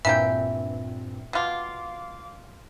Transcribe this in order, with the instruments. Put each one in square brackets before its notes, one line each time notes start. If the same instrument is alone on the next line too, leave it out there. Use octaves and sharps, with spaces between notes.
[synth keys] G2 A#2 C4 [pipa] E3 A#3 G5 [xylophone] E5
[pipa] B2 F4 [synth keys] F5 D6